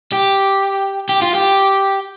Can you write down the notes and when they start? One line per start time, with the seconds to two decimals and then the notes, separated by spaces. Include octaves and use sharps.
0.12 G4
1.09 G4
1.22 F4
1.35 G4